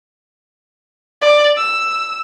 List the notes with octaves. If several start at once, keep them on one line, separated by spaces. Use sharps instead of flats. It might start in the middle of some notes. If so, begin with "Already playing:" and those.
D5
E6